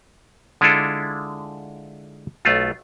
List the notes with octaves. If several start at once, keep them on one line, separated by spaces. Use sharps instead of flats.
D3 G#3 D4 E4 F4 A4
B1 A3 F4